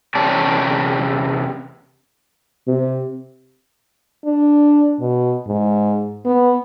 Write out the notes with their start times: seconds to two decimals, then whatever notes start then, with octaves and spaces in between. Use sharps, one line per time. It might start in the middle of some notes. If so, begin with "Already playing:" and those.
0.15 E2 C3 C#4 E4 D5 A5
2.67 C3
4.25 D4
5.00 B2
5.47 G#2
6.25 B3